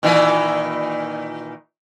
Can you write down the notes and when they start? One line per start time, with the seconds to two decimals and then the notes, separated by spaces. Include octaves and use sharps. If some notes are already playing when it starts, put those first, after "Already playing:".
0.03 A#2 D#3 E3